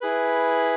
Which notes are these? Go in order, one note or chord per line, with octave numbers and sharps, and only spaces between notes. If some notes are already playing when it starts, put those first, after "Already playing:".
E4 G#4 B4